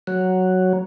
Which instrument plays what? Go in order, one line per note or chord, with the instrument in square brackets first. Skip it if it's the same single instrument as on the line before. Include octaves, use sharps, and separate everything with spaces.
[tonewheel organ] F#3